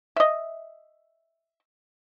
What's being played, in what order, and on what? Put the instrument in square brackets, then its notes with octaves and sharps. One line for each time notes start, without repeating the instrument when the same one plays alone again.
[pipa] D#5 E5